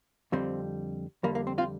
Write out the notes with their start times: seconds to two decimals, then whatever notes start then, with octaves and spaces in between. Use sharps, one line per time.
0.32 F2 D3 G3 C4
1.23 F2 D3 G3 A#3
1.35 A#3
1.47 C4
1.58 C4 F4